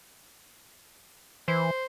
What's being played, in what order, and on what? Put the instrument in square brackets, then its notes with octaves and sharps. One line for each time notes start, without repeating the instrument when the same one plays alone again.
[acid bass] E3 [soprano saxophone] C5